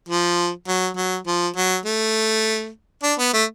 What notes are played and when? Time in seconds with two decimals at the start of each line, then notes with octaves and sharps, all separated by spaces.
0.09 F3
0.68 F#3
0.96 F#3
1.27 F3
1.56 F#3
1.86 A3
3.03 D4
3.18 B3
3.33 A3